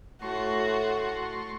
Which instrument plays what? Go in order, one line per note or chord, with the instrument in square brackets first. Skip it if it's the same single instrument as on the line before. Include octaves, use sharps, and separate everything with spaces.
[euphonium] A2 [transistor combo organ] A3 C6 C#6 [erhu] F#4